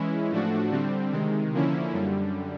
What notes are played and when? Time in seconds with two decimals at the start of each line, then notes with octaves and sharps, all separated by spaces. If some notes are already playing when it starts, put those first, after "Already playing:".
Already playing: E3 G#3 C#4 E4
0.31 A2 F3 A3 D4 F#4
0.71 D3 G3 C4
1.12 C3 D#3 G#3
1.53 D3 F3 A#3 C#4 E4
1.93 F#2 D3 G3